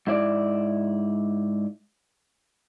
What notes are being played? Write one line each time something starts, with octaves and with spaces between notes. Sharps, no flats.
G#2 E4 D5